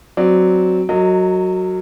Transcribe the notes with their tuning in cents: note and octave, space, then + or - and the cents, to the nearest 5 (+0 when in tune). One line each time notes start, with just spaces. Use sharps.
F#3 +0 C4 +0 D5 +0
F#3 +0 A#4 -35 D#5 +5